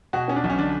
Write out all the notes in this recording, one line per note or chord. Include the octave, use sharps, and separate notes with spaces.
B2 F#4
B3 C#4
D4
B1
C#4
D3 D4